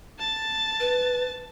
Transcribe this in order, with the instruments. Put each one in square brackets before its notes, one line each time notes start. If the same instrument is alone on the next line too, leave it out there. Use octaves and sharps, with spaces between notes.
[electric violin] A5 A6
[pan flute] B4